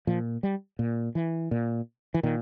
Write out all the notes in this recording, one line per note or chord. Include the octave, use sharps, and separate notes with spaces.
A#2 F3
G3
A#2
E3
A#2
E3
A#2 D#3